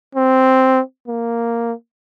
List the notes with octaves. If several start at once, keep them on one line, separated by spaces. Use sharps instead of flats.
C4
A#3